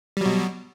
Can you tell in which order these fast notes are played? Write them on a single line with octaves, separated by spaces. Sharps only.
G3 F#3 B2